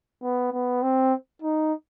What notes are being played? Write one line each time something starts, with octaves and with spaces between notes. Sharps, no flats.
B3
B3
C4
D#4